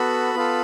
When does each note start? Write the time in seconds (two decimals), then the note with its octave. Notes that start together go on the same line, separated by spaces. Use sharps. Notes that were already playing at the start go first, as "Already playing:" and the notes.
Already playing: B3 F#4 A4 B5
0.34 B3 F4 A4